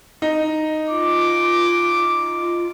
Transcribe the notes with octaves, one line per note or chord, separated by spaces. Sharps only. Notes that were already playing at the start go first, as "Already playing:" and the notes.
D#4
F4 D6